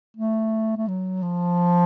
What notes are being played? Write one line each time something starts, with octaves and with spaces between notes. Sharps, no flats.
A3
A3
F#3
F3